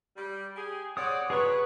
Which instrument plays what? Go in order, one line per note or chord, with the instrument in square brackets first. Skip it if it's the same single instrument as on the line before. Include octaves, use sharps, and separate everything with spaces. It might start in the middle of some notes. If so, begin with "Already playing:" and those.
[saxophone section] G3
G4 G#4
[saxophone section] C4 C#5 D5 [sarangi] F#5 [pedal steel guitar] D#6
[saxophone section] F#3 D4 C#5 [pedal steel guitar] G#4 C#6 [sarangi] B4